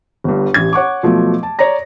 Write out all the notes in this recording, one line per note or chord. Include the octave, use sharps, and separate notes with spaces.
G1 G2
A1 G4 G#6
C#5 F#5 C#6 D6
B2 F3 F#3 A3
A5
C#5 D5 A#5 A#6